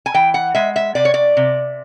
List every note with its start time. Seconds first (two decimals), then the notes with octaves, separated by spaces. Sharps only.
0.06 G#5
0.14 E3 G5
0.34 F#5
0.55 G#3 E5
0.76 E5
0.95 C3 D5
1.05 C#5
1.14 D5
1.37 C3